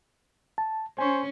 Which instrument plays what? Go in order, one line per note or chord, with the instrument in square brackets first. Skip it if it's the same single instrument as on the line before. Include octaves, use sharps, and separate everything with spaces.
[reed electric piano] A5
[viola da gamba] C#4 [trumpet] C5 [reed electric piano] G#5 C#6